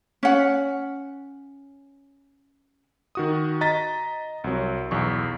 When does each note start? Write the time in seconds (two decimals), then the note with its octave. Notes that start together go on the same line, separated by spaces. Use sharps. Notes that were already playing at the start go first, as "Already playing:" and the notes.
0.23 C#4 F#5
3.15 D#3 F#4 D#6
3.61 D#5 A#5 A6 B6
4.44 C2 F#3
4.91 B1 E2 C#6